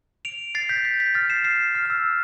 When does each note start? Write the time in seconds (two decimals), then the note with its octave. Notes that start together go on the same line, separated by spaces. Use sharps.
0.25 D7 F7
0.55 A6 C7
0.69 G6 B6
0.85 G6 B6
1.00 G6 B6
1.14 F6 A6
1.30 C7 E7
1.44 C7 E7
1.75 F6
1.85 F6
1.90 E6